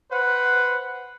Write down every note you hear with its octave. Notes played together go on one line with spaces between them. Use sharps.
B4 C5 F#5